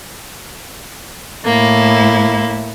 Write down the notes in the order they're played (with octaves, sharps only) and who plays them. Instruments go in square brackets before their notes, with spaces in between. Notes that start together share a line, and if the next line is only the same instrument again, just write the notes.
[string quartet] A2 E4 [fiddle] A#3